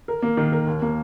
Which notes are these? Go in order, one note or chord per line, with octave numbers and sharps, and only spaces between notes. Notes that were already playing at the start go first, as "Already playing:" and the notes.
A#4
A#3
D#3
A#4
D#2
A#3